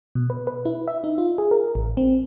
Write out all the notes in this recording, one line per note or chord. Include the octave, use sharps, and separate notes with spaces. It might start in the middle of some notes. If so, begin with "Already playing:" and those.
B2
B4
B4
E4
E5
D#4
F4
G#4
A#4
A1
C4